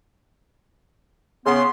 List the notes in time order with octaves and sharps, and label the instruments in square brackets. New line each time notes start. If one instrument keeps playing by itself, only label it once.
[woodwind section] C#3 B3 [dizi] C6